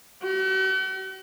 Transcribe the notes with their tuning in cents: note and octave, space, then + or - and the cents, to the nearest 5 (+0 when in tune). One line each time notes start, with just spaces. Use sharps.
F#4 +45